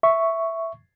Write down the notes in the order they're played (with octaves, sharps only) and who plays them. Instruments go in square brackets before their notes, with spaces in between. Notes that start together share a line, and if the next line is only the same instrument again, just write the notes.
[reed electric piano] E5 C#6